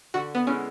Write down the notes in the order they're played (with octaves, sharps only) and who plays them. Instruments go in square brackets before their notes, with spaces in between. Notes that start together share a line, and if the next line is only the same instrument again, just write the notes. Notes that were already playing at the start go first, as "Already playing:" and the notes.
[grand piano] D3 [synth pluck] F#4
[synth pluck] B3
[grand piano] G#3 B3 E4 [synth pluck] C#4